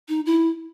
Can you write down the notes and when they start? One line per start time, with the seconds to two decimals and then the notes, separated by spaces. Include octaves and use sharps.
0.09 D#4
0.26 E4